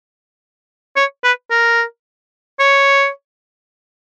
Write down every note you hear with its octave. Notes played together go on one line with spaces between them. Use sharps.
C#5
B4
A#4
C#5